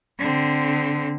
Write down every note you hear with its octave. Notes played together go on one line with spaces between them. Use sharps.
D3 C4